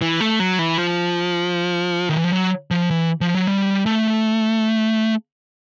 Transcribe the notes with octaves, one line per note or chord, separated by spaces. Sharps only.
E3
A3
F#3
E3
F3
D#3
E3
F3
F#3
F3
E3
F3
F#3
G3
A3